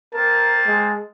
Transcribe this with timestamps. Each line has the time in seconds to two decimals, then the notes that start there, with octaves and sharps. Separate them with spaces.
0.13 A#3 C4 A#4 A5
0.67 G#3